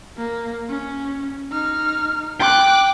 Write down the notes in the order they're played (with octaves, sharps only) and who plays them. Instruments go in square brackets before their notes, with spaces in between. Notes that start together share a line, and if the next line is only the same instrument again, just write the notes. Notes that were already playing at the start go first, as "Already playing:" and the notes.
[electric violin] A#3
C#4
D#4 F6
[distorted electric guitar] G5 [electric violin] D6 F#6